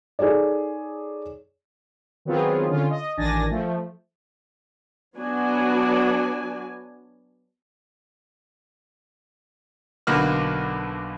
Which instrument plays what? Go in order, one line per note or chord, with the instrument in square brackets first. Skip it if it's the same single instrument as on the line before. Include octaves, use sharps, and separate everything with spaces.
[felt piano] D#4 G#4 A4 C#5 D5
[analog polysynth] D#3 F#3 B3 C4 F4 G#4
D3 C#4 F4
D#5
A1 D#3 D4 G#5 A6 A#6
F3 A3
[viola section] F#3 B3 D4 F#4 G#5
[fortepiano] B1 D3 A#3 F#4 B4 F6